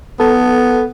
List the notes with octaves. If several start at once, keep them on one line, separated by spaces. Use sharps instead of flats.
B3 A4